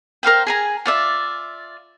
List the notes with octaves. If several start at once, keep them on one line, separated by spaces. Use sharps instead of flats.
A#4 C5 F5 G5
G#4 G#5 A#5
F4 D5 E5